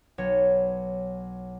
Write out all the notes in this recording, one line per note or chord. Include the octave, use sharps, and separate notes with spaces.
B1 C#5